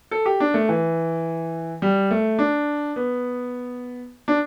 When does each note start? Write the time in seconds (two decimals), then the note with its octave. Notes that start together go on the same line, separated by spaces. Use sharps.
0.11 A4
0.26 G4
0.40 D4
0.54 A3
0.69 E3
1.82 G3
2.11 A3
2.39 D4
2.96 B3
4.28 D4